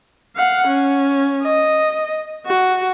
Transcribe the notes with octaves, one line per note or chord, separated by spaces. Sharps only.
F5 F#5
C#4
D#5
F#4